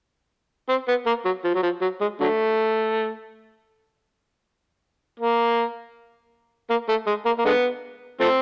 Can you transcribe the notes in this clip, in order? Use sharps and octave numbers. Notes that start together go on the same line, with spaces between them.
C4
B3
A#3
F#3
F3
F#3
F3
F#3
G#3
D3 F#3 A3
A#3
A#3
A3
G#3
A#3
A#3
D3 G#3 B3
F3 A3 C4